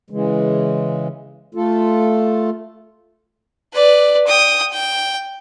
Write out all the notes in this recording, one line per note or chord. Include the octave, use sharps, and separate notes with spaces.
C#3 E3 G#3
A3 F4 A4
B4 D5
G5 D#6
G5